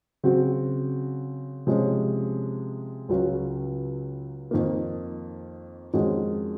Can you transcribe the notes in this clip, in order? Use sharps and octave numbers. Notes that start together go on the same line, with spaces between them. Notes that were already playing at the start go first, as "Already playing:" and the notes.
C#3 F#3 C4 F#4
C3 F3 G#3 C#4
C#2 C#3 F#3 C#4 F4
F2 D#3 A#3
F2 D#3 G#3 C#4 F#4